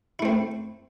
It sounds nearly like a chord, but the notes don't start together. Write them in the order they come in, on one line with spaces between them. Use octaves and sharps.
E4 A3 C4